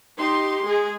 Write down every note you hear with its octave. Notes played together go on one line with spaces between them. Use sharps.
D#4 G4 C6
G#3 G#4